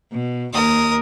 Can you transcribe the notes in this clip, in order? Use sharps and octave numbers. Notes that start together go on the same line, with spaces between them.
B2
D#2 A#4 D#6